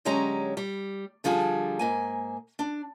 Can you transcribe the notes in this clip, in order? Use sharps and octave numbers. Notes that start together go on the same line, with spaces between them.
D3 F#3 G#3 C#4 G4 A#5
G3
D3 F3 G3 G#4 A5
G#2 A#3 G#5
D4